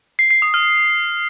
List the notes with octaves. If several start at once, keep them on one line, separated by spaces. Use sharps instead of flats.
C7
C7
D#6
F6